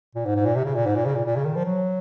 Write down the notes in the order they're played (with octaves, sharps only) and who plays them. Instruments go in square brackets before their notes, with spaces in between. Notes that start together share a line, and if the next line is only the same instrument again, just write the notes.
[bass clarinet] A#2
G#2
G#2
A#2
C3
C#3
A#2
G#2
A#2
C#3
A#2
A#2
C#3
D#3
F3
F#3